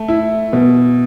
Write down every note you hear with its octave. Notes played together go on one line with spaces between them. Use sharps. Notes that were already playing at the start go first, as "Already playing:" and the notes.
Already playing: A3
E4
B2